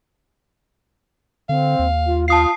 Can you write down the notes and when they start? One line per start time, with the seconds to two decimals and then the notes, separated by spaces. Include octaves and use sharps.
1.49 D3 C4 F5
1.79 D#2
2.06 F4
2.28 F4 F5 A5 D#6 C7